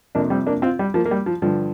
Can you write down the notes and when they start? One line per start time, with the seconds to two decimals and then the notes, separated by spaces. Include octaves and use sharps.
0.15 F2 C3 A#3 D4
0.30 G3 C4
0.47 A#3 D4
0.62 C4 F4
0.79 G3
0.94 F3 A#3
1.06 A#3
1.11 G3
1.26 F3
1.42 G2 D3 F3